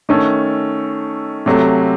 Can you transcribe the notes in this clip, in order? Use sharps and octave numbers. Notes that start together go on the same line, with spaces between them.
D#3 A3 C#4 A4
C3 F#3 A3